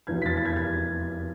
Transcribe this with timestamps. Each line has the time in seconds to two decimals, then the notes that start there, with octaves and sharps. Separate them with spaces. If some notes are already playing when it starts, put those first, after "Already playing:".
0.07 F1 E2 B2 G#6
0.22 B6
0.26 A6
0.37 A6
0.45 G#6
0.56 G#6